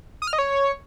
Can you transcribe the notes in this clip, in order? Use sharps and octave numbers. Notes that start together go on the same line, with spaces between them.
D#6
F6
D#5
C#5